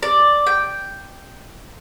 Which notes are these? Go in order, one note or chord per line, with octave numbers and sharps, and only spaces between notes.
D5
G5